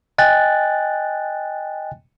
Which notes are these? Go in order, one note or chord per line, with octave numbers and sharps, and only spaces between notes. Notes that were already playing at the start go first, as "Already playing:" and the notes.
D#5 G5 G#5 F#6 A6